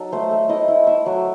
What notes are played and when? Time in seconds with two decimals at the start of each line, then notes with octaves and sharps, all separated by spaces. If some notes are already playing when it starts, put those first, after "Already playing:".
Already playing: F#3 D#4 A4
0.12 A3 C5
0.31 A3
0.49 E4 D#5
0.68 E4
0.87 E4 E5
1.06 F#3